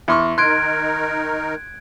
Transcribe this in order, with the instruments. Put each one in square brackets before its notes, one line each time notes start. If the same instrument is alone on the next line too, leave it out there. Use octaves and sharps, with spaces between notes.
[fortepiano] E2 C6 C#6
[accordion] D#3 D#4 A#4 [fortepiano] C6 [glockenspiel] F#6 G#6 D7